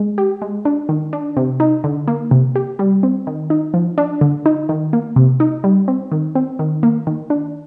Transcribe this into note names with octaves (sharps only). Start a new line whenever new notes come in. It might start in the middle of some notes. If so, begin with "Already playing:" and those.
Already playing: G#3
G4
G#3
D4
D#3
D4
C3
D#4
D3
A#3
C3
G4
G3
C4
D#3
D#4
F3
D4
D3
D#4
D#3
A#3
C3
D#4
G3
C4
D#3
C4
D#3
A#3
D#3
D4